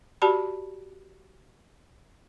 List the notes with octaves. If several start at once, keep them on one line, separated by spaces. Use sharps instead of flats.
F#4 G4 D5 A5 B5